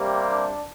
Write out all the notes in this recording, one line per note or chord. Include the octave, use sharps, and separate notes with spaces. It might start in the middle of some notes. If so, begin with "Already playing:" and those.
Already playing: C3 G3 A#3
D4